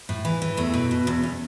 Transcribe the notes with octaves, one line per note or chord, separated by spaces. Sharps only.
A2
E3
E3
E2 A3
B2
B2
E2
C#4